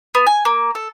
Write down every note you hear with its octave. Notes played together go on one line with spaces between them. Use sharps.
B3
G#5
A#3
A4